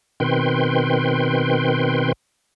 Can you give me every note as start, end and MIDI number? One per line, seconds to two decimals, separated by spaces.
0.20 2.12 47
0.20 2.12 51
0.20 2.12 60
0.20 2.12 71
0.20 2.12 79
0.20 2.12 84